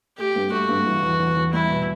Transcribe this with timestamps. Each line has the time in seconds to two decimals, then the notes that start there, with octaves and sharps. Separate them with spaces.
0.18 A3 G4
0.36 G2
0.52 A3 F#4
0.69 G2
0.86 E3
1.03 E2
1.19 E2
1.36 E2
1.53 G3 E4
1.70 B2